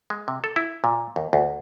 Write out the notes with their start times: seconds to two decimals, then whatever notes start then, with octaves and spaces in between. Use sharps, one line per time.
0.10 G#3
0.28 C3
0.44 A4
0.56 E4
0.84 A#2
1.16 D#2
1.33 D2